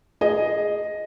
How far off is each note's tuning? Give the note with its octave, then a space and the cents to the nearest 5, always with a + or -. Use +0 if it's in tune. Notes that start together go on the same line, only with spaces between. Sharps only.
G#4 +0 D#5 +0